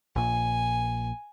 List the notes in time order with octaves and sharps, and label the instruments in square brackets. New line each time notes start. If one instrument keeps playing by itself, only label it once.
[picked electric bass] A#1 A#2 [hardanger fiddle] G#5